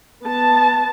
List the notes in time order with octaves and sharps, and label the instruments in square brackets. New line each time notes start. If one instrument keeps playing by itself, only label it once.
[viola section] B3 A5